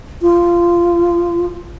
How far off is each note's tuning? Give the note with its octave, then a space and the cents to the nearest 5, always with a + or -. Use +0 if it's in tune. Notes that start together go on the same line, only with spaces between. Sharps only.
F4 -15